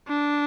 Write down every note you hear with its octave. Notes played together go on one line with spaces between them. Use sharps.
D4